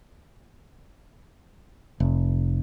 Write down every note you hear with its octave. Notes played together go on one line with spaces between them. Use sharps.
F1